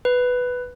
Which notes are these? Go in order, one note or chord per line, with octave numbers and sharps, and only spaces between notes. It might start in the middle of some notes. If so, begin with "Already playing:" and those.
B4